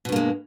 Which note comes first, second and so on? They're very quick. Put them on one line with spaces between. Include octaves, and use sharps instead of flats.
B2 G2 A#3 G#3